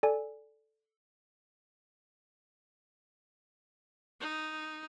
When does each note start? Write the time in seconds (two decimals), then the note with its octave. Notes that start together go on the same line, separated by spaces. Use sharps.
0.03 A4 D5 G#5
4.20 D#4